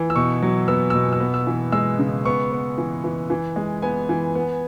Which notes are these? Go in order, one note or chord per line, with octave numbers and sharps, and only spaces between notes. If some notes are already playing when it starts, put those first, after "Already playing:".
Already playing: E3
E6
B2 C#6
F#3
B3 E6
B2 E6
E6
B3
E6
E3
G#3 E6
C#3
B3 C#6
B3
E3
E3
E3
G#3
B3 G#5
E3
B3